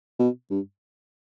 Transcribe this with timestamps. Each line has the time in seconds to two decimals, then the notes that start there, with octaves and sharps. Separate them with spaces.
0.19 B2
0.50 G2